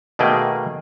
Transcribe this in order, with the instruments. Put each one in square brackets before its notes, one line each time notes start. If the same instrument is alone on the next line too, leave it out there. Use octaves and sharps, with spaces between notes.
[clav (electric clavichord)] B2 D#3 A3 A#3 G#4 G5